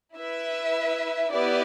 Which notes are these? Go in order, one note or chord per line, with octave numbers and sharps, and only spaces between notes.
E4 B4 E5
B3 E4 G4 B4 D5